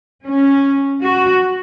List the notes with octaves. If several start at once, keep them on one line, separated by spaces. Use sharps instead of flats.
C#4
F#4